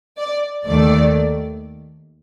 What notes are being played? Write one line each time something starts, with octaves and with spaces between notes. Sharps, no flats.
D5
D#2 D#3 A3 D5